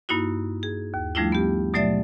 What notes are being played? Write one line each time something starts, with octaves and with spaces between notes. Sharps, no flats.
G2 A#3 D#4 E4 F#4
G#4
D#2
F3 G3 A3 D4 E4 F4
B3 G4
B2 F#3 A3 D5 E5 A6